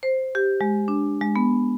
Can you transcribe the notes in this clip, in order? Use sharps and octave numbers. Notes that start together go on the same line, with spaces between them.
C5
G4
G#3
D4
G#3
B3